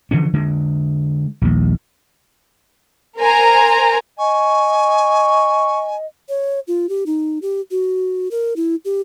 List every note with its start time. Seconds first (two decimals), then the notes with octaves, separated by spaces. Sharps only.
0.11 D3 E3 F3 C#4
0.33 D3 G#3
1.41 A#1 D#2
3.18 A#4 C5 G#5 A#5
4.18 D#5 G#5 C#6
6.29 C#5
6.67 F4
6.89 G4
7.06 D#4
7.42 G4
7.71 F#4
8.31 A#4
8.56 E4
8.85 G4